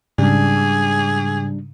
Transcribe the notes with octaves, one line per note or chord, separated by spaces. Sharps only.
G#2 C#3 G3 D4 G#4